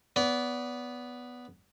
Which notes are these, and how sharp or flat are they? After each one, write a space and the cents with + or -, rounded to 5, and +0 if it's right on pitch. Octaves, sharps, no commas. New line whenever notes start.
B3 +0 D5 -30